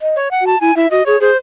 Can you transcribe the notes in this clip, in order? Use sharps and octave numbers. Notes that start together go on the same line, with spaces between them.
D#5
C#5
F#5
F#4
A5
E4 G#5
E4 E5
F#4 D#5
G#4 C#5
G#4 C5